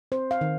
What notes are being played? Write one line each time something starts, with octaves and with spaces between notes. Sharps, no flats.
C4 C5
F5
D#3